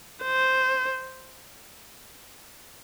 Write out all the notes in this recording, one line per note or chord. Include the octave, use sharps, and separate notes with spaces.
C5